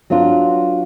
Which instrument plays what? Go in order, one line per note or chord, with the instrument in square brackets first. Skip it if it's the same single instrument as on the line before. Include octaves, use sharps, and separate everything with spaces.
[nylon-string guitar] F#3 B3 D4 F4